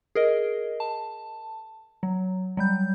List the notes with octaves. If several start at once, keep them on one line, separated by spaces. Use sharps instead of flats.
G#4 A#4 D#5
A5
F#3
F#3 G3 G6